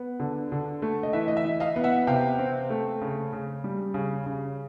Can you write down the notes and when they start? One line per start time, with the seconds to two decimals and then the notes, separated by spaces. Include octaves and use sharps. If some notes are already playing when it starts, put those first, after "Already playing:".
Already playing: B3
0.20 D3
0.52 D3
0.82 A3
1.03 D#5
1.13 E3 E5
1.28 D#5
1.37 E5
1.45 E3
1.60 D#5 F5
1.76 B3
1.84 E5 F#5
2.07 C3 F5 G5
2.39 C4
2.70 A3
3.01 C#3
3.33 C#3
3.64 G3
3.94 C#3
4.26 C#3